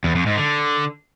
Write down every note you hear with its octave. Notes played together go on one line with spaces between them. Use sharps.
E2
F2
G#2
D3